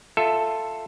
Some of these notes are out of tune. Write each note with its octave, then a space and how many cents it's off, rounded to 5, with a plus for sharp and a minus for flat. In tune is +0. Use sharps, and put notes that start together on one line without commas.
F4 +0 A4 +10 E5 +0